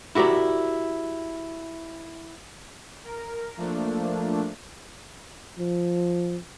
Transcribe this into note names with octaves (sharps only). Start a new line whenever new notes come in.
E4 F#4 G4 A#4 D5
A#4
F3 A3 A#3 D4
F3